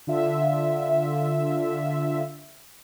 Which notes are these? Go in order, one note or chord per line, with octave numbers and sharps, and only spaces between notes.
D3 F4 E5